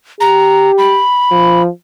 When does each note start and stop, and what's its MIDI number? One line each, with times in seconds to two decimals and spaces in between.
0.21 1.01 67
0.21 0.71 82
0.78 1.62 83
1.31 1.69 53